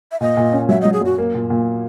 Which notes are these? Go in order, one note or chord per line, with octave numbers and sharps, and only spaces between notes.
E5
A#2 D#5
A#2
C#4
F#3 E5
D#5
F#3
G#4
F#2 F#4
A#3
A#2
A#2